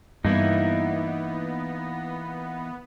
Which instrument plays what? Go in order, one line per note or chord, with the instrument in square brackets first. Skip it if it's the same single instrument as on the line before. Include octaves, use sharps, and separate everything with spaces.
[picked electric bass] G2 [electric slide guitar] E3 A#3 E4 [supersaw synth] B3 [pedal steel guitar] D#4